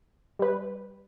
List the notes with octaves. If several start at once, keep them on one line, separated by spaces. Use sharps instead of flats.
G3 B4